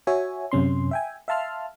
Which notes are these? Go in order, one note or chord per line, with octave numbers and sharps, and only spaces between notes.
F#4 C#5 E5 G#5
F#2 C3 C#4 C6
E5 G5 G#5
E5 F5 A5 C6 F6